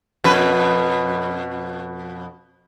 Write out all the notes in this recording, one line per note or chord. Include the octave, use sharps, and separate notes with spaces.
F2 B2 B4